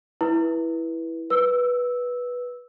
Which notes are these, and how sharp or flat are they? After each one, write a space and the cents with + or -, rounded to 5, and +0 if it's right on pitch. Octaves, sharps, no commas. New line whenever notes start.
E4 +0 B4 -20
B4 -10 E6 -5